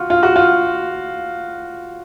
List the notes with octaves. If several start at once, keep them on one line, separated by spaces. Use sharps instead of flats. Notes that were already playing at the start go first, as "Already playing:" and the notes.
Already playing: F4 F#4
F4
F#4
F4